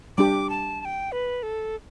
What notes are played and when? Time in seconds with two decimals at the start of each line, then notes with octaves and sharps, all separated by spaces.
0.17 G3 D4 G4 D6
0.50 A5
0.81 A5
0.85 G5
1.12 B4
1.43 A4